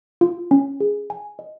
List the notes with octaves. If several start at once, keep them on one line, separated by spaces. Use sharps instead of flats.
F4
C#4
G#4
G#5
D#5